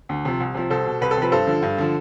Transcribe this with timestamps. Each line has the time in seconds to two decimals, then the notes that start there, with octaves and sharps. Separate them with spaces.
0.09 D2
0.25 C3 F3
0.40 C2
0.55 C3 F3
0.70 C2 A4 C5
0.85 B2
1.01 C2 B4
1.11 A4
1.17 C3 F3 B4
1.32 G2 A4 C5
1.47 D3 F3
1.62 G2
1.78 D3 F3